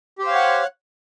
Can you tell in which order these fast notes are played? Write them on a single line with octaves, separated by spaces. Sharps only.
G4 C5 F5 C#5 F#5